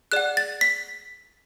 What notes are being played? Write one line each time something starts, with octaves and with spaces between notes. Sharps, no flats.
G#4 D5 F#5 F#6
A6
B6